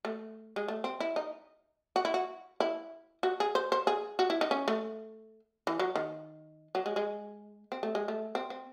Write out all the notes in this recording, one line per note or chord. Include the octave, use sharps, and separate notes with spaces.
A3
G#3
A3
C4
E4
D#4
F#4
E4
F#4
E4
F#4
G#4
C5
C5
G#4
F#4
E4
D#4
C#4
A3
E3
F#3
D#3
F#3
G#3
G#3
C4
A3
G#3
A3
C4
C4